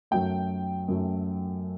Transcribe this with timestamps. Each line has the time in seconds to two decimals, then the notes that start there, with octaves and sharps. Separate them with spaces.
0.11 F#2 F#3 A3 G5
0.88 F#2 F#3 A3